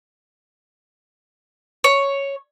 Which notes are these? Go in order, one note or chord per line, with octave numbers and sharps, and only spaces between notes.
C#5